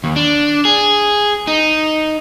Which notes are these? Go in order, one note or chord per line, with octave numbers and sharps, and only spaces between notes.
D#2
D4
G#4
D#4